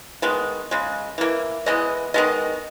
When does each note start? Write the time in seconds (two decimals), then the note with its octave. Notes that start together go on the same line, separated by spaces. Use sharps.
0.22 D#3 G#3 B3
0.71 C#3 G#3
1.18 E3 A#3
1.66 E3 G#3 B3 D#5
2.14 D#3 G#3 B3 D#5